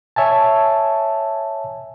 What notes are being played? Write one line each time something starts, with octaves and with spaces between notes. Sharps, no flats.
C#5 E5 G#5 A5